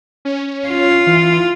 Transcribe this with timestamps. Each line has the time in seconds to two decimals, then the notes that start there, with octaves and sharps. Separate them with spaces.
0.25 C#4
0.68 F4
1.07 E3